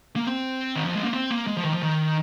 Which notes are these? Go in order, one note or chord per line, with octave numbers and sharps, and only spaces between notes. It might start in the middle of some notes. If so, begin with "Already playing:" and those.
A#3
C4
D#3
F3
G#3
A#3
C4
A#3
G#3
F3
D#3
F3
D#3